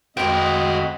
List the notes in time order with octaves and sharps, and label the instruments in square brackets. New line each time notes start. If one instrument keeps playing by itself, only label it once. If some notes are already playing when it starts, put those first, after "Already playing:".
[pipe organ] F2 G#3 B5 [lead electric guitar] F#4 C5 [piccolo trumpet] D#5 [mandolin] F#5 G5